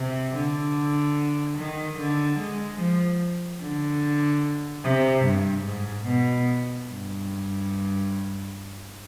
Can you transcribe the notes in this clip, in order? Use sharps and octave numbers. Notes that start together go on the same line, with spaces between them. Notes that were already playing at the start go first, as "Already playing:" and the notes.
Already playing: C3
D3
D#3
D3
G#3
F3
D3
C3
G2
G#2
B2
G2